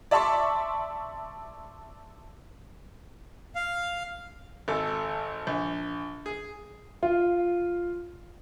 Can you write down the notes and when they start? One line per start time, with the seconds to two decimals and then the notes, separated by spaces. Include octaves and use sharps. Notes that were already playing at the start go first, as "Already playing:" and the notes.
0.11 D5 E5 A5 C6 C#6
3.55 F5
4.68 G#1 A4
5.47 A#1
6.26 G#4
7.03 F4